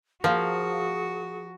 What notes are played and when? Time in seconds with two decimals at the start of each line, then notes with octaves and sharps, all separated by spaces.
0.24 F3 F#4 G#4 A#4 F5